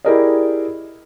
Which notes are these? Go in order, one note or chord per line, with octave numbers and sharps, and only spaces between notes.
E4 G4 G#4 A#4 D5 D#5